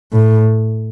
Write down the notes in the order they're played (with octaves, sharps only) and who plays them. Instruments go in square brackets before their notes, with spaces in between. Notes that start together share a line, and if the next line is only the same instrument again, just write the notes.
[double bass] A2